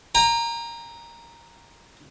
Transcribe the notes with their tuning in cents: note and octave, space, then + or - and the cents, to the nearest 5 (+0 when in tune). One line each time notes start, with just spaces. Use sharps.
G5 +45 A#5 +0